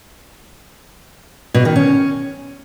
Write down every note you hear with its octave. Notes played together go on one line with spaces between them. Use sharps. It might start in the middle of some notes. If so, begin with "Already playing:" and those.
B2
D#3
C#4